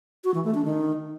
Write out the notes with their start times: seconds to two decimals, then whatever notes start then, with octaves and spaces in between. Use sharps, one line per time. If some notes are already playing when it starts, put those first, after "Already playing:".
0.24 F#4
0.34 E3
0.44 A3
0.55 D4
0.65 D#3